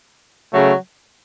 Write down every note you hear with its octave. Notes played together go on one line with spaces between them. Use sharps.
C#3 F#3 A3